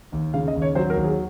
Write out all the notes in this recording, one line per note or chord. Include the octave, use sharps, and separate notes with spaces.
D#2
C#3 F5
D#5
D#2
C#5
F#3 C5
A#4
D#2
G#4